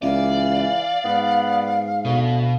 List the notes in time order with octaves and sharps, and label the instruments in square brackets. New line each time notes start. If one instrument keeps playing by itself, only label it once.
[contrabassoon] C#2 [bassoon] E3 [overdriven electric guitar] D5 [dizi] F5
[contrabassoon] G#2 [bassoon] B3
[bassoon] D2 [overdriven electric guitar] B2